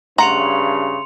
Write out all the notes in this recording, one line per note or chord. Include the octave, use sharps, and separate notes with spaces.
G2 C#3 A3 F#5 A#5 C6 C#7 F7